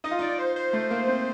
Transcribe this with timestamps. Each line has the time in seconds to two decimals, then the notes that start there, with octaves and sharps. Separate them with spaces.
0.04 D#4 D#5
0.11 F4
0.19 D#4 D5
0.38 C5
0.56 C5
0.73 A3
0.91 A#3
1.08 C4